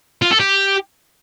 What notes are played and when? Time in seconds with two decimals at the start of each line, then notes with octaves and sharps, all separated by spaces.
0.22 F4
0.31 A4
0.40 G4